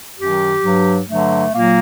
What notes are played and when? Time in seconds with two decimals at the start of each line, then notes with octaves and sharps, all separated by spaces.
0.17 F#2 D#3 F#3 G4
0.63 G2 F#3
1.08 G2 D3 F#3 A3
1.53 A#2 F#3 A#3